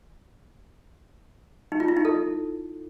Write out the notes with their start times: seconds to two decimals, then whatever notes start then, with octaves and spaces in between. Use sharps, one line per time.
1.72 D#4
1.80 F4
1.88 E4
1.97 D#4
2.05 A4